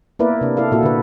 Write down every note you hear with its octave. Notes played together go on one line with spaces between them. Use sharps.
A#3 B3 E4 A#4 B4 D5
C3 D4
E4 A4 D5 F5
A#2 A#3 E4 F#4 A4
D3 B4